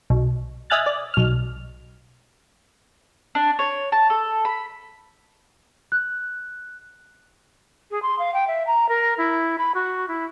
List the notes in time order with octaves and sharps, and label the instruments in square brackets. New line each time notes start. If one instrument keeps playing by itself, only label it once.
[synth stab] B1
D#5 E5 G#5 F6 F#6 A6
D5
B1 F6
[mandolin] D4
C#5
A5
A4
B5
[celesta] F#6
[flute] G#4
C6
F5
G5
E5
A#5
A#4
E4
B5
F#4
E4